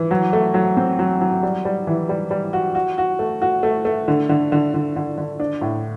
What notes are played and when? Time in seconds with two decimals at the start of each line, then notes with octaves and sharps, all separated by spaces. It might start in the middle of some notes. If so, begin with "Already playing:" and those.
Already playing: E3
0.11 F#3
0.33 A3
0.54 F#3
0.77 C4
0.99 F#3
1.21 F#3
1.43 G3
1.65 G3
1.87 E3
2.09 G3
2.31 G3
2.53 F#4
2.75 F#4
2.98 F#4
3.19 A3
3.42 F#4
3.63 A3
3.85 A3
4.08 D3
4.29 D3
4.52 D3
4.74 D3
4.96 D3
5.18 D3
5.40 D4
5.62 A2